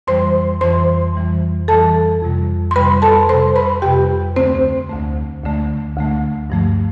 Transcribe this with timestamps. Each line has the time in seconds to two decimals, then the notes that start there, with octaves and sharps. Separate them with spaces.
0.07 F2 E3 G3 C5 C6
0.61 F2 E3 G3 C5 C6
1.16 F2 E3 G3
1.68 F2 E3 G3 A4 A5
2.22 F2 C3 G3
2.71 C6
2.76 F2 C3 G3 B4 B5
3.02 A4 A5
3.29 F2 C3 G3 C5 C6
3.56 B4 B5
3.82 F2 C3 G3 G4 G5
4.36 D2 D3 A3 C4 C5
4.89 D2 D3 A3
5.43 D2 D3 A3
5.96 D2 D3 A3
6.50 G2 F3 A3